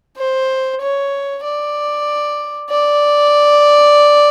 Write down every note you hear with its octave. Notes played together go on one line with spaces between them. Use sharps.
C5
C#5
D5
D5